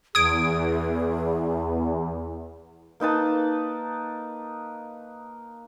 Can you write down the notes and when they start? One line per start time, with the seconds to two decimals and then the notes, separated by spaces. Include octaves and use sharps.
0.15 E2 G#4 D#6 G#6 D7
3.00 A#3 D#4 B4 A5